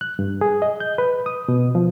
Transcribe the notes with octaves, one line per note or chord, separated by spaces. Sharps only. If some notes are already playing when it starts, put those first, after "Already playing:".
F#6
G2
G#4
D#5
G6
B4
D#6
B2
F3